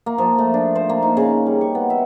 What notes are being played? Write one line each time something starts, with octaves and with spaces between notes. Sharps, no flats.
A#3
F3
A3
D4
C5
A#3
D#4
C#3
G3
C#6
B3
E5